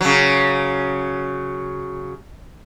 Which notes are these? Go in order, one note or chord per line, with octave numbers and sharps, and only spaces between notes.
C#3 F#3